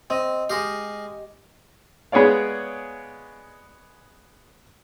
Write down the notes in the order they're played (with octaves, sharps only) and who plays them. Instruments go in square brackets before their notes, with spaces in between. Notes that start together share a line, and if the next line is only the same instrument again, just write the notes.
[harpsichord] C4 [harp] D#5
[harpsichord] G#3 D#5 F5 [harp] G4
[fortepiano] G#3 B3 G#4 C#5 D5 F5